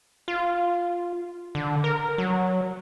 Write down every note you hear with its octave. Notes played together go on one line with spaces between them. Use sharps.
F4
D3
A#4
F#3